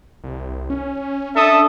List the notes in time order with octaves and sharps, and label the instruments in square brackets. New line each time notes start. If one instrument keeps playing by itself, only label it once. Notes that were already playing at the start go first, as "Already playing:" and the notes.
[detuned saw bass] C2
C#4
[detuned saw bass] D4 [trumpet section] A4 E5 D#6